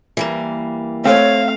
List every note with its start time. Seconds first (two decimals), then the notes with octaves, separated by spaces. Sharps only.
0.17 E3 G3 A#3
1.06 A3 C4 C#5 F5